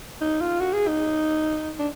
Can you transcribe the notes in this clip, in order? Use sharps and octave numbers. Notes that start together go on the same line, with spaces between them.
D#4
F4
F#4
G#4
D#4
D4